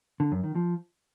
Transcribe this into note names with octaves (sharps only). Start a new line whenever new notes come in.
D3
F#2
D#3
F3